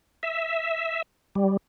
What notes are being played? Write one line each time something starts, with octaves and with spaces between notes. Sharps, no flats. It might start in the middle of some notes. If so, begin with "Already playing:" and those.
E5
G3